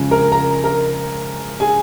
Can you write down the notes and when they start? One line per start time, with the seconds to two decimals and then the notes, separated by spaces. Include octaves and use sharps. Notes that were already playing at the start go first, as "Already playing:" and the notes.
Already playing: F2 C#3 G#3 C#4
0.11 A#4 A#5
0.32 A#4 A#5
0.64 A#4 A#5
1.60 G#4 G#5